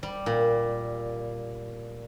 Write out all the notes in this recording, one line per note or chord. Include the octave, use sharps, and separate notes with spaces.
G3
A#2